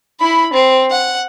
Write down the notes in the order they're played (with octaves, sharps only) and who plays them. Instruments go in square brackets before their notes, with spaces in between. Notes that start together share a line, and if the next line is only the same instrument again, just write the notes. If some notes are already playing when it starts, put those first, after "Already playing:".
[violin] E4 B5
C4
F#5